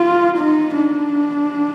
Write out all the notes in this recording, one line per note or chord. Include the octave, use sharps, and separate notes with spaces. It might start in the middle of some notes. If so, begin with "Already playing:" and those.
Already playing: F4
D#4
D4